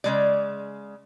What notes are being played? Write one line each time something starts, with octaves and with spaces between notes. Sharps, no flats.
C#3 G#3 D5